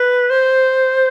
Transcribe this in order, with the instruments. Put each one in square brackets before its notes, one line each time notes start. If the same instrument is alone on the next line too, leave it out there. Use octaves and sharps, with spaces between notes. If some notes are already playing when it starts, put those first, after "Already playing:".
Already playing: [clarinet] B4
C5